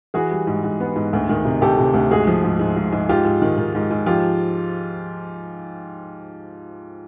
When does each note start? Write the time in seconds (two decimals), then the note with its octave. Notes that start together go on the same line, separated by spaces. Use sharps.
0.14 E3 F#4 G#4
0.31 G3
0.47 G#2
0.64 G#2
0.80 B3
0.96 G#2
1.13 D2
1.29 D#3
1.45 C3
1.62 D2 G4 A4
1.78 C3
1.94 D2
2.11 G#2 F#4 G#4
2.27 F3
2.44 G#2
2.60 G#2
2.77 G#2
2.93 G#2
3.09 G#2 F4 G4
3.25 G#2
3.42 D#3
3.58 D#3
3.75 G#2
3.91 G#2
4.06 F3 F4 G4